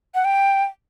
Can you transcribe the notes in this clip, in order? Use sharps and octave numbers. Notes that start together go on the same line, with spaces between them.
F#5
G5